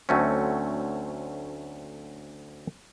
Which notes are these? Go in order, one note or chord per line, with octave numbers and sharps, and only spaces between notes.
D2 F#3 A3 C4 C#4